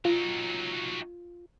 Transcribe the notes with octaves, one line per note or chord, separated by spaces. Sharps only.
F#3 D#4 F4